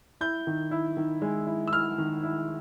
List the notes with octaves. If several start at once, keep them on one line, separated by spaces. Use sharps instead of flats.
E4 G6
D#3
E4
D#3
G#3
E4
E6
E4 F6
D#3
E4